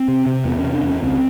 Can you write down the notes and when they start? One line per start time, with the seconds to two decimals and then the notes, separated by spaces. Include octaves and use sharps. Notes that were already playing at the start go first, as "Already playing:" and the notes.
Already playing: C4
0.08 C3
0.26 C3
0.45 E2 B3
0.59 C#4
0.64 C3
0.74 D4
0.83 E2 C#4
1.02 C#2 C4